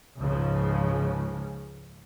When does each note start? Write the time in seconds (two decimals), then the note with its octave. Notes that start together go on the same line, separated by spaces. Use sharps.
0.17 C#2 G#2 C#3 F3